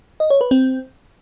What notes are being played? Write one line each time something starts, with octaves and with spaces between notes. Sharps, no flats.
D#5
C#5
B4
C4